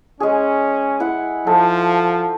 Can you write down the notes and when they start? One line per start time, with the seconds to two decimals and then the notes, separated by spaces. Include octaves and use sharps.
0.20 G#3 C#4 G#4
1.00 E4 F#5
1.47 F3 A4